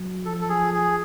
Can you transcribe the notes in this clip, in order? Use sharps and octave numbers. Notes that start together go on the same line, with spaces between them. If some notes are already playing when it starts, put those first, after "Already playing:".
Already playing: F#3
F3 A4
A4
G#4
G#4